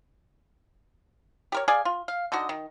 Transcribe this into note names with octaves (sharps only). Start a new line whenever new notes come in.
G4 A#4 C#5
G#4 D5 F5 G#5
F4
F5
D3 D#4 F#4 D#5
D#3